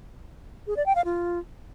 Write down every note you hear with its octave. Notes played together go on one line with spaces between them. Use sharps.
G#4
D5
G5
F5
F4